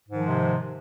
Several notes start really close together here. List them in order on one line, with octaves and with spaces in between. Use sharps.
G#2 D#3 F3 G#3 C3